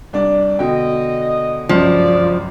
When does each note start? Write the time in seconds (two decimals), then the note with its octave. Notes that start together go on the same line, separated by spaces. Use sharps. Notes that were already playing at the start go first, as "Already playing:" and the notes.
0.13 C2 D4 D5
0.59 B2 D3 D#5 G5
1.69 G1 C#2 F#2 F3 D5